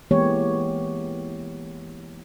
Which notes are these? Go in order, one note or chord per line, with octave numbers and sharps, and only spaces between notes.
E3 G#3 A#3 B3 G4 C#5